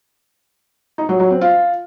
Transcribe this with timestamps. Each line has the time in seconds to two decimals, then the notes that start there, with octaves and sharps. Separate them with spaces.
0.98 D#4
1.09 F#3
1.20 F#3
1.31 C4
1.41 F4